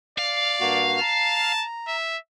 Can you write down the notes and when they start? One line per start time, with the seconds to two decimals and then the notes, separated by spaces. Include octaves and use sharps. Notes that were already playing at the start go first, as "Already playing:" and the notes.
0.18 D5 F5
0.61 G2 A#3 F#4
1.01 A5 A#5
1.88 E5